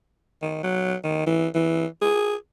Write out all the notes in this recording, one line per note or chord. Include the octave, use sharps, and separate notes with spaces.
D#3
F#3
D#3
E3
E3
G#4